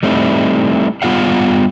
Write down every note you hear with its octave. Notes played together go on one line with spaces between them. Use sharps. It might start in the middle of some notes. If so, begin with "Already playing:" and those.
G3 A3 C4 D#4 E4
G3 B3 F4 G#4 F5 F#5